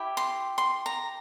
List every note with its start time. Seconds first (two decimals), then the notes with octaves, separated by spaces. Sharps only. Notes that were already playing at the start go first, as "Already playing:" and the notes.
Already playing: E4 G4
0.17 C6
0.58 C6
0.86 A#5